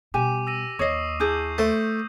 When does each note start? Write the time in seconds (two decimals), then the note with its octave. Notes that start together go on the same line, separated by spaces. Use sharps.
0.14 B2 G3 G4 G#5 D6 D#7
0.47 E6 A#6 D#7
0.79 D#2 C#5 D#5 C#6 D#6 C7
1.20 D4 E4 G#4 E6 G6
1.58 A3 C5